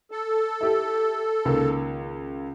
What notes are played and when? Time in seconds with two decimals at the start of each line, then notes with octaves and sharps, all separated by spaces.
0.11 A4
0.61 E4 G4
1.45 C#2 D#3 A#3